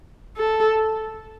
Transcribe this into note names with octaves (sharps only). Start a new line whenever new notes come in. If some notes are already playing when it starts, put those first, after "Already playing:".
A4